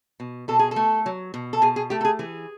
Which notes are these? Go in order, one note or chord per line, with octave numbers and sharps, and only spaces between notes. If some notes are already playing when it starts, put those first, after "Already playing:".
B2
B2 A4
G#4
A4
A3
F#3
B2
A4
B2 G#4
G#4
A3 G4
A4
G#4
E3 G#4